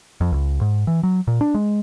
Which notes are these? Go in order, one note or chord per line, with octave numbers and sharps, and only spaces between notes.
F2
C#2
G#2
E3
F#3
A#2
D4
G#3